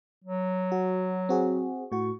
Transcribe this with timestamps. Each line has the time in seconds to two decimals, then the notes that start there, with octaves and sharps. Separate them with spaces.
0.24 F#3
0.72 F#4
1.29 C4 F#4 G#4
1.92 A2 F#4 C#6